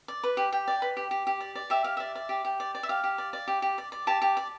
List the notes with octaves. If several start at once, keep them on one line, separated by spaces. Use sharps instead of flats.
D5
B4
G4
G4 G5
D5
B4
G4
G4
G4
D5
D5
G4 E5
G4 F5
D5 E5
D5
G4
G4
D5
D5
E5
G4 F5
G4
D5
D5
G4
G4
D5
D5
G4 A5
G4
D5